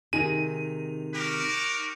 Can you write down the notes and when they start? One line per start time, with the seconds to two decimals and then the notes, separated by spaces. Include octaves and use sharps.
0.13 C3 D#3 D#4 G#4 D#7
1.13 F#4 G4 A#4